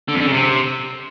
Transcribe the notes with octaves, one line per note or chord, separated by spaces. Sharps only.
D3
F2
D3
C#3
C3